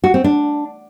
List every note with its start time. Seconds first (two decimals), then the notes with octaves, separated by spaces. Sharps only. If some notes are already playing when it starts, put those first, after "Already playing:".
0.04 F#4
0.14 C4
0.24 D4